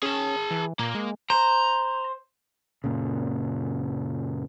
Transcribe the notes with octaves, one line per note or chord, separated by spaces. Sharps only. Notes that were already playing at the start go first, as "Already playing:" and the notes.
C#4 G#4 A5
E3
A#2 A#3
G#3
C5 A#5
F#1 A#2 C#3